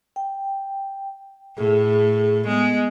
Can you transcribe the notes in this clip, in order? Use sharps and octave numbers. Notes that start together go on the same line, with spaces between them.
G5
A2 G#4
G#3 B3